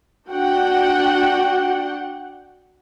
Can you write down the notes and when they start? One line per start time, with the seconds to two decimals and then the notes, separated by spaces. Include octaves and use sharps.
0.30 D4 F#4 F#5 G5